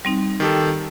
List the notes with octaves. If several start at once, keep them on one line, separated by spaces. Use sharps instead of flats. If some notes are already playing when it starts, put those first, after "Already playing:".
G3 C4 D#4
D#3 G4 A4